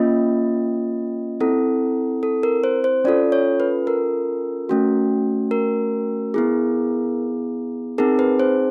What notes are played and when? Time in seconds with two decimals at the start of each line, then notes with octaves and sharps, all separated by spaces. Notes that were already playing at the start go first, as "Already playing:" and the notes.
Already playing: A#3 C#4 F4 D#5
1.40 C4 E4 A4
2.23 A4
2.43 A#4
2.64 C5
2.84 C5
3.05 C#4 F4 A4 D5
3.32 C#5
3.60 B4
3.87 A#4
4.69 A3 C#4 F#4
5.51 A#4
6.34 B3 E4 G#4
7.98 C4 D#4 G#4 A#4
8.19 B4
8.40 C5